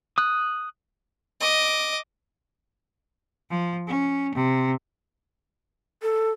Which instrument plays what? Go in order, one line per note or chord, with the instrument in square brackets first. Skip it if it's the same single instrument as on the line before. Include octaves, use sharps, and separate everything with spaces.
[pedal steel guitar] D#6 F#6
[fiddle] D#5 D6
[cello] F3
C#4
C3
[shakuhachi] A4